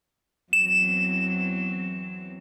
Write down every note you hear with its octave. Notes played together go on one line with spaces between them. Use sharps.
E2 F#3 C4 E7